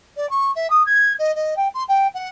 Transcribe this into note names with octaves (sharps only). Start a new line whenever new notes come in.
D5
C#6
E5
D#6
G#6
D#5
D#5
G5
C6
G5
F#5